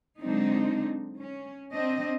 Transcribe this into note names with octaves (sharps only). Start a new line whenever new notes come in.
D3 F#3 G#3 C4 D4 D#4
C#4
C4 D4 D#5